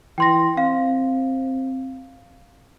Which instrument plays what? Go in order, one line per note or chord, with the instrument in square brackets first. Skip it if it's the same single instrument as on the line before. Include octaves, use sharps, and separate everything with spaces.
[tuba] E3 [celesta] G5 C6 A#6
[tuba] C4 [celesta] F5